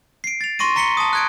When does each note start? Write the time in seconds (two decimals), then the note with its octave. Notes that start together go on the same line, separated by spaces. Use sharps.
0.24 C7 D7
0.41 A6 F7
0.59 C6 C#6 A#6 D#7
0.76 A#5 C#6 B6 C#7 G7
0.97 A5 D#6
1.13 F#6 G#6 D7